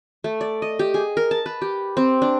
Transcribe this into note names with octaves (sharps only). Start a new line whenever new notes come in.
A3
D5
D#5
G4
G#4
A#4
A5
B4
G4
C4
D4